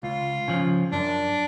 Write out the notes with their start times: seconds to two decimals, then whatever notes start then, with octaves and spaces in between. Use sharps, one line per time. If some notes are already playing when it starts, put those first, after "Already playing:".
0.03 C#2 F4
0.48 C#3 F3
0.92 F#2 D4